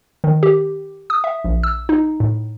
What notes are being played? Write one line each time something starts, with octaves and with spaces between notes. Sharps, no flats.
D#3
G4
D#6
E5
A#1
E6
D#4
A2